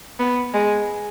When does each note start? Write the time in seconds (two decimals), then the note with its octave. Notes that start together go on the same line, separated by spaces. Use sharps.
0.19 B3
0.54 G#3